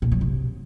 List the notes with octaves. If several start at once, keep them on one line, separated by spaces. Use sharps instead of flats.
A#2
F#3
C3